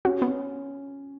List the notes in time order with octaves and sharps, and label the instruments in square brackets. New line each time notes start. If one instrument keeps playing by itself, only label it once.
[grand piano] C#4 [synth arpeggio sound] F#4
[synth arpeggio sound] B3
[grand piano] C#4